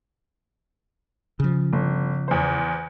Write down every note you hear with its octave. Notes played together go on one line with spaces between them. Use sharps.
C#3 F3
G1
E2 C5